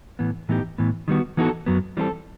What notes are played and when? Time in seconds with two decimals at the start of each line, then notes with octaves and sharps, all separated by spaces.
0.19 A2 E3 B3
0.49 A2 E3 B3 D#4 G4
0.78 A2 E3 B3
1.08 D#3 G3 B3 F#4
1.37 E3 B3 D#4 F#4 A4
1.66 F#2 F#3 B3
1.97 E3 G3 C4 E4 A4